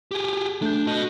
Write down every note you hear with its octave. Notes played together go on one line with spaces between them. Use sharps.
G4 G#4
A3 D4 G6
F#4 D#5